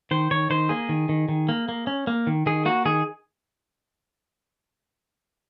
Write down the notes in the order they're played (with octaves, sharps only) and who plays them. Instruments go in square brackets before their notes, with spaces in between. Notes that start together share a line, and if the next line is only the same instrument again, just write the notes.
[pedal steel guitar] D#3 C5
D#3 C#5
D#3 C5
A#3 G#4
D#3
D#3
D#3
A#3
A#3
C#4
A#3
D#3
D#3 G#4
A#3 F#4
D#3 G#4